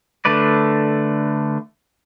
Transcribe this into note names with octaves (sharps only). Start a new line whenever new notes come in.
D3 A3 D4 B4 D5